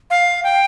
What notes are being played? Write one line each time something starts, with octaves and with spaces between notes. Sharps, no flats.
F5
G5